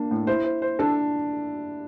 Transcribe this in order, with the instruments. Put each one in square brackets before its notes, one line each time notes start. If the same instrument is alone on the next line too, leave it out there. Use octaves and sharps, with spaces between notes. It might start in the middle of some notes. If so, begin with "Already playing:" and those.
Already playing: [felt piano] A#3 D4
[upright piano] A2
[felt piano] E4 [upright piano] C5
[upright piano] C5
C5
[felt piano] D4 [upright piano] A4